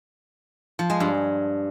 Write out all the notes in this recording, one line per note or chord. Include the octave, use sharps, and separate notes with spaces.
F3
G#3
G2